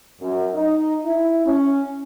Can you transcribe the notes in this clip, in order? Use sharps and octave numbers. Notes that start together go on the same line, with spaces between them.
F#2
D#4
E4
C#4